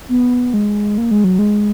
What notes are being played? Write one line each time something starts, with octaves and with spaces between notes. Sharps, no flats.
B3
G#3
A#3
G#3
F#3
G#3